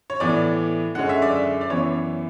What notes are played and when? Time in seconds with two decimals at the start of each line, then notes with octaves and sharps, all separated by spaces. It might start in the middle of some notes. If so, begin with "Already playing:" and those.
0.10 C#5
0.20 A2 E3 B3 D5
0.95 F#2 D3 G#3 C#4 F#5
1.09 E5
1.22 D5
1.35 E5
1.61 D5
1.70 F#2 E3 B3 C#5